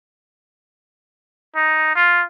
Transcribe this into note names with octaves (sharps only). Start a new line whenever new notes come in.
D#4
F4